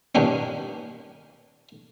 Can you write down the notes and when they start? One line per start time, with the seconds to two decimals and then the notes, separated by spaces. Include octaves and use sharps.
0.15 G2 A#2 D#3 C#4 D4